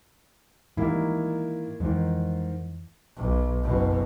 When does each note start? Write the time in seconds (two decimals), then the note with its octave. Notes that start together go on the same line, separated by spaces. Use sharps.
0.77 G#2 D#3 E3 G3 A#3 E4
1.80 F2 G#2 D#3 E3
3.17 B1
3.63 F#1 B2